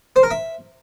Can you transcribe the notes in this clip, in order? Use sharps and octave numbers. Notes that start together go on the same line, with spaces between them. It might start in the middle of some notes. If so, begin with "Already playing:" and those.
C5
A#4
E5